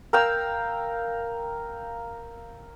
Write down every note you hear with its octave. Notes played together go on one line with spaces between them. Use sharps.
A#4 F5 G5 E6